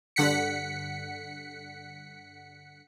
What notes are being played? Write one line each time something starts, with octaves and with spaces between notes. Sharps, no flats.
G2 D3 F#5 B6 C#7